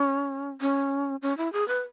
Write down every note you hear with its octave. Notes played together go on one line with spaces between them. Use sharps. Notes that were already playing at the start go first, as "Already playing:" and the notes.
Already playing: C#4
C#4
C#4
E4
G#4
B4